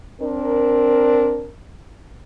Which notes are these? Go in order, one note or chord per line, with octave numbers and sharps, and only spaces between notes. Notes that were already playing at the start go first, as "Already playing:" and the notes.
C4 D4 A#4